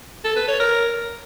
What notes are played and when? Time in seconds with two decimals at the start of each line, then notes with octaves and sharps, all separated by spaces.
0.24 A4
0.36 B4
0.48 C#5
0.60 A#4